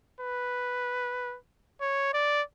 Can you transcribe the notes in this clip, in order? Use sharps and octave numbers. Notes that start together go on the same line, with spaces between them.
B4
C#5
D5